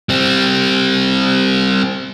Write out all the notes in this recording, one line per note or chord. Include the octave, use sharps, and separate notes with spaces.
G3 C4